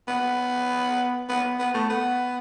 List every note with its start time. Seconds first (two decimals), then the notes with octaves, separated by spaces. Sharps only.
0.08 B3
1.29 B3
1.59 B3
1.74 A3
1.90 B3